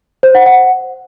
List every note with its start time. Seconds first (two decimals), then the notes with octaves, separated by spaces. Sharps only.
0.23 C5
0.35 F#5
0.46 F#5